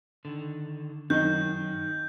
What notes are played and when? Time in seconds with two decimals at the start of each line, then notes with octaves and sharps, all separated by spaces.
0.25 D3 D#3
1.10 F#2 D#3 D#4 G6